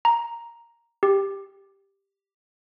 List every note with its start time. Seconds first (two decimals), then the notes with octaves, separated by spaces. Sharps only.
0.05 A#5
1.03 G4